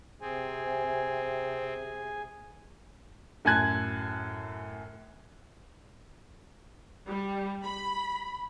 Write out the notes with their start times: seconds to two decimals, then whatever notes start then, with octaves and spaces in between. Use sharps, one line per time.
0.21 C3 C4 G#4 G#5
3.45 F#2 A2 G#5 A5 F#6 G#6
7.09 G3
7.64 B5